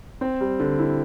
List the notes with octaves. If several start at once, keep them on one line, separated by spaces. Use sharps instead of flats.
C4
G3
D3
E4